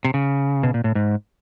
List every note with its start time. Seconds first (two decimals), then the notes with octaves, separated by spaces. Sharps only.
0.05 C3
0.14 C#3
0.63 B2
0.74 A#2
0.84 A2
0.95 G#2